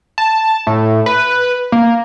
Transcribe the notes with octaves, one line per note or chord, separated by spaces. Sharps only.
A5
A2
B4
A#3